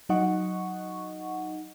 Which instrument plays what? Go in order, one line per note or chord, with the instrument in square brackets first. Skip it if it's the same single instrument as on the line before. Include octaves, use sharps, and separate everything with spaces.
[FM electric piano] F#3 D#4 D#5 F#5 C#6